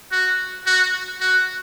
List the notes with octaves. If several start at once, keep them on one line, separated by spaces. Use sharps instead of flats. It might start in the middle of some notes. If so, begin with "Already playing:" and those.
F#4
F#4
F#4